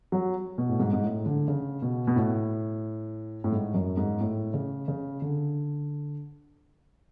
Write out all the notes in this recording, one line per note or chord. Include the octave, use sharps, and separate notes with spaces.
F#3
B2
A2
G#2
G#2
A2
D3
C#3
B2
B2
A2
A2
G#2
F#2
G#2
A2
C#3
C#3
D3